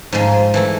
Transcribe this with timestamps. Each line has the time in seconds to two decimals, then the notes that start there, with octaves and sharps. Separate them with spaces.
0.12 G#2 F3 G#3
0.54 E3 A3 E4